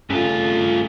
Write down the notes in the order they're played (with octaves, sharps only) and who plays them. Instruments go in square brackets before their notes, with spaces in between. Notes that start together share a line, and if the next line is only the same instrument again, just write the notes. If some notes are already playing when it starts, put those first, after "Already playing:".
[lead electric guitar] G2 F4 [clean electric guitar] C#3 A3